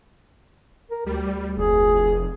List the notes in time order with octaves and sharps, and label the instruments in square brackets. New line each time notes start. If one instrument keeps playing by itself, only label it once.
[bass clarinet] A#4
[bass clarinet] D2 [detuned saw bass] G3
[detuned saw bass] F1 [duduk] G#4